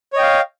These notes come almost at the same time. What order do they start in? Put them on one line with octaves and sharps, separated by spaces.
C#5 D#5 G5 F5